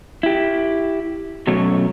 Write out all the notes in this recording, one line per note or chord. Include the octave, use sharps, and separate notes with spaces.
E4 G4
B2 F#3 A3 C#4